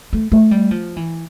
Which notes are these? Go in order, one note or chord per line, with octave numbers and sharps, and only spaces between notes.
A3
A3
G3
F3
E3